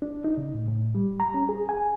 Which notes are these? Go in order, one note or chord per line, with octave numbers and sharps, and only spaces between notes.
D4
D#4
C#3
A2
A2
G3
A#5
C#4
G#4
G#5